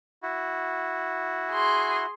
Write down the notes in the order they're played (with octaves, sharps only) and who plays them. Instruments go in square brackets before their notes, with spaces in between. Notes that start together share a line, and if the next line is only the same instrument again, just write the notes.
[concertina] E4 F#4
[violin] G#4 C6